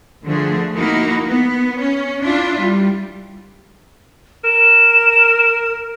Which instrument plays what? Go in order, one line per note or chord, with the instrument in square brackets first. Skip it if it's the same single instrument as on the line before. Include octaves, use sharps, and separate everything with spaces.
[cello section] D3 F3 A3 G#4
A#3 D#4 E4 F#4
B3
C#4
D4 E4 F4
G3
[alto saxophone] A#4 [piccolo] E7